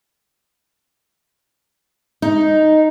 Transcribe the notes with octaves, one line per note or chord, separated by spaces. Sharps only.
D#4